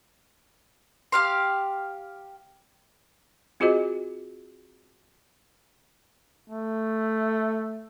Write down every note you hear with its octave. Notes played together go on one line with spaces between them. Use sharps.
G4 F5 C6
C4 F4 F#4 G#4 C5 D#5
A3